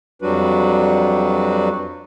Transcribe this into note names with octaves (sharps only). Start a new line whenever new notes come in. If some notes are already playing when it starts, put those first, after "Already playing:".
F2 F#3 G3 D4 F#4 B4